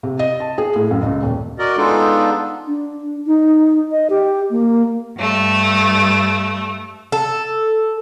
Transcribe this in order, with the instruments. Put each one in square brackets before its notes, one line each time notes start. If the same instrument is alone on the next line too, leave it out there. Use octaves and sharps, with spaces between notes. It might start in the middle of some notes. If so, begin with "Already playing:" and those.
[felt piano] C3
D#5
A5
G#4
A2
F#2
C#2
D#1
[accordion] F#4 A#4 D5 D#5
G#3 B3 D4 D#4 F4 A4
[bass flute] D4
D#4
D#5
G4
A#3
[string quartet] G2 A3
[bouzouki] A4